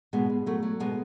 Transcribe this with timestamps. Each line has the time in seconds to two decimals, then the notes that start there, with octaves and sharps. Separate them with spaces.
0.13 B2 G#3 B3
0.30 B2
0.46 F#3 A3
0.63 F#3
0.80 B2 G#3 B3